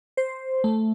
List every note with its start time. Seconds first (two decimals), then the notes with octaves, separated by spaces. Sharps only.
0.17 C5
0.64 A3